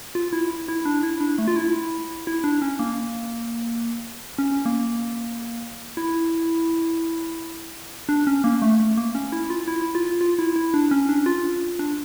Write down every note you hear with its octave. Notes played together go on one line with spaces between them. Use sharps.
F4
E4
E4
D4
E4
D4
A3
F4
E4
E4
D4
C#4
A#3
C#4
A#3
E4
D4
C#4
A#3
A3
A3
A#3
C#4
E4
F4
E4
F4
F4
E4
E4
D4
C#4
D4
F4
D4